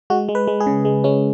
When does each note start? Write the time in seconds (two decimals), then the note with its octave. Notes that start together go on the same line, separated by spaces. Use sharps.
0.10 G#3 F#4
0.29 G#3
0.35 B4
0.47 G#3
0.60 G#4
0.67 C#3
0.85 G#3
1.04 G#3 C#4